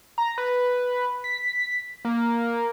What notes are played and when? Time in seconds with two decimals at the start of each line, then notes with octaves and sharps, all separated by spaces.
0.18 A#5
0.38 B4
1.24 B6
2.05 A#3